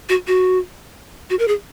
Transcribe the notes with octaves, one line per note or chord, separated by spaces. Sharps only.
F#4
F#4
F#4
A#4
G#4